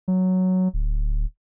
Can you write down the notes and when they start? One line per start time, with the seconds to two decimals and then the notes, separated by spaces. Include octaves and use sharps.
0.08 F#3
0.74 D1